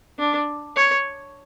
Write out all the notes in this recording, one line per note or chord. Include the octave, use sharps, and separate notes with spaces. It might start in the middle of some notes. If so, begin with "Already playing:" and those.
D4
C#5